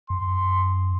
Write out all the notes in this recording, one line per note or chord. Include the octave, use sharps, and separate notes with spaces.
F#2 C6